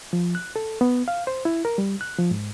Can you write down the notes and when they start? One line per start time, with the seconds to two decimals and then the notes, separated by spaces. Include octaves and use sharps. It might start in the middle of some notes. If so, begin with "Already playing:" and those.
0.13 F3
0.35 F#6
0.56 A4
0.81 B3
1.08 F5
1.27 C5
1.45 E4
1.65 A#4
1.78 G3
2.01 F#6
2.18 F3
2.31 G#2